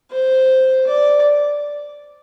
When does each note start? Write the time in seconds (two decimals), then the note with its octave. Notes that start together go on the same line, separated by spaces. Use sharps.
0.11 C5
0.87 D5